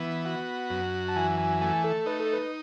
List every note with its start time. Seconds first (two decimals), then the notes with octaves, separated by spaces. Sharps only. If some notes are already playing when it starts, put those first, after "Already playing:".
Already playing: E3 B3
0.25 F#4 F#5
0.70 F#2
1.09 A5
1.16 E3 G#5
1.38 G#5
1.61 A3 G#5
1.84 A4
2.06 D#4 B4
2.20 A4
2.33 B4